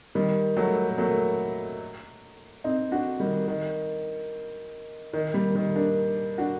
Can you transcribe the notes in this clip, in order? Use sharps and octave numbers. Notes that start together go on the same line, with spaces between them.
D#3 G3
F#3 A3
A#3
F#3 A3
C4 D#4
D4 F#4
D#3 G3
D#3
D#3
G3 A#3
D#3 G3
A#3 D4
D4 F#4